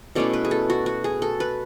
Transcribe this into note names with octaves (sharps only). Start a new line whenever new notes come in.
B2 A3 C#4 E4 D5
B4
G#4
A4
F#4
F#4
G#4
A4
B4